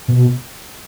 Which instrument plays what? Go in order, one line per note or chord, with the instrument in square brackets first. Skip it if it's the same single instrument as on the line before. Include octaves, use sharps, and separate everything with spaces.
[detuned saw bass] B2